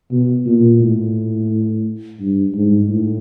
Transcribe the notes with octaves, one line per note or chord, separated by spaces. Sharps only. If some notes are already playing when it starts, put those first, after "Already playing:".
B2
A#2
A2
G2
G#2
A2